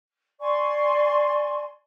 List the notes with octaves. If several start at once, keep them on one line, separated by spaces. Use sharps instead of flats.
D5 G#5 C6 C#6